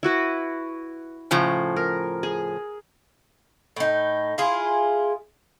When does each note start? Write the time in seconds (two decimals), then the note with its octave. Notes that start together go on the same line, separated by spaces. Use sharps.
0.03 E4 F#4 B4
1.31 A2 C#3 F3
1.77 A#4
2.23 G#4
3.76 A2 D#4
4.38 E4 F4 G#4